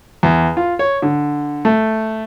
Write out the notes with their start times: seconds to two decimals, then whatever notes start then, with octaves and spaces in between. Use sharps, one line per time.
0.23 E2
0.57 F4
0.79 C#5
1.02 D3
1.65 A3